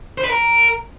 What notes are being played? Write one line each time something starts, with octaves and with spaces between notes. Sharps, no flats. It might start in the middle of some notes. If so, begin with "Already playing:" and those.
C5
B4
A#4